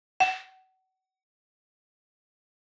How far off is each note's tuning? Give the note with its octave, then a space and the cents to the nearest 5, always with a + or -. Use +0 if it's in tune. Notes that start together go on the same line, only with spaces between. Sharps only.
F#5 +35